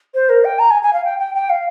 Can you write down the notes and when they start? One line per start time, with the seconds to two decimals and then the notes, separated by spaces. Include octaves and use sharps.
0.14 C5
0.29 A#4
0.44 G5
0.59 A#5
0.70 G#5
0.82 G#5
0.93 F5
1.04 G5
1.19 G5
1.34 G5
1.49 F5